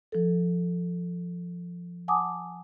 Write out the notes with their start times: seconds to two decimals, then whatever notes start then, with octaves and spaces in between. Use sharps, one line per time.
0.12 F3 A4
2.08 F#5 G#5 A5 D6 D#6